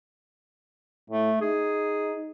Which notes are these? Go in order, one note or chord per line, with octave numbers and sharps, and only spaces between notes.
A2 A3
D#4 G#4